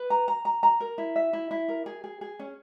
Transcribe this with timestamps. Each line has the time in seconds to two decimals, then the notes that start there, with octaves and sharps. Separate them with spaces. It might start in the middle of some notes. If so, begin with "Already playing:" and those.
Already playing: B4
0.10 A#5
0.28 A#5
0.45 A#5
0.63 A#5
0.80 A#4
0.98 E4
1.16 E5
1.33 E4
1.51 E4
1.68 A#4
1.86 G#4
2.04 G#4
2.21 G#4
2.39 C#4